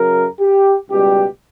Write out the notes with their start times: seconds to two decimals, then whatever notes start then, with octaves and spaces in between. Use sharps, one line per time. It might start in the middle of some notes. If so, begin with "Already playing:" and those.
Already playing: F#2 C#3 F#3 A#4
0.40 G4
0.90 C#2 B2 G3 G4